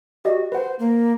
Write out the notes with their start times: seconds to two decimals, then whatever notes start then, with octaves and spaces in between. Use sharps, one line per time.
0.25 F#4 G4 D5 D#5
0.52 B4 C5 F#5
0.79 A#3